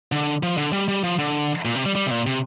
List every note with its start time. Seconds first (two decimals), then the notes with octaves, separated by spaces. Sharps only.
0.12 D3
0.43 F3
0.57 D3
0.73 G3
0.88 G3
1.04 F3
1.19 D3
1.65 A#2
1.75 C3
1.85 G3
1.96 G3
2.06 C3
2.11 A#2
2.27 C3